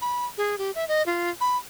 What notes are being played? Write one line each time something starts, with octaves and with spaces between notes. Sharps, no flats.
B5
G#4
G4
E5
D#5
F4
B5